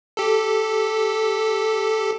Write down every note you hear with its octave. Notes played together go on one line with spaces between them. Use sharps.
G4 A4